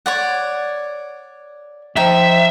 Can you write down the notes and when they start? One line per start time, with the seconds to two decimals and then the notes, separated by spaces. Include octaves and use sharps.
0.06 C#5 D5 F#5
1.97 F3 D#4 E5 G5